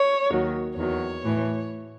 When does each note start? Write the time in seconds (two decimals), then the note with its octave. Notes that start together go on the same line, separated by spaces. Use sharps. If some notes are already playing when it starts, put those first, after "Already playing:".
Already playing: C#5
0.31 D#2 D#3 F#3
0.77 E2 D#3 F#3 C#5
1.24 A2 E3